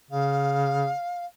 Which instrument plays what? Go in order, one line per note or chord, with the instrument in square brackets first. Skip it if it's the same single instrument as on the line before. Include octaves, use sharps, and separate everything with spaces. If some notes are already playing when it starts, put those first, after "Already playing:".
[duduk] C#3 [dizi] F5